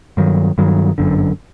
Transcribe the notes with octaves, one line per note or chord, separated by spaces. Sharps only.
G2 D#3 F#3
G2 D#3 F#3
G1 F#2 D3